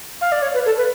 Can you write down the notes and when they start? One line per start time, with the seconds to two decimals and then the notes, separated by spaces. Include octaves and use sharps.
0.21 F5
0.32 D5
0.42 C#5
0.54 B4
0.66 A4
0.77 B4